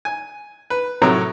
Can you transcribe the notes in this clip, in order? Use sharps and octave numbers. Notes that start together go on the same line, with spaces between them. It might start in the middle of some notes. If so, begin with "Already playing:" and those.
G#5
B4
A2 C3 F#3 A3